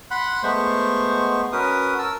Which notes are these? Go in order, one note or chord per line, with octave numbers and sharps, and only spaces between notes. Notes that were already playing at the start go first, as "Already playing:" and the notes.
F#5 B5 C6 F#6
G#3 A3 B3 C5 C#6
C#4 F#4 A#4 B4 D#6
A#4 A5 E6